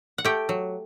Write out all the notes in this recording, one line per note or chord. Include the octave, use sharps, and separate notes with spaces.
F#5
A3 G4 G5
F#3